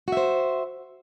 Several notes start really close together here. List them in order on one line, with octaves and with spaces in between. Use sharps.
F#4 E5 C5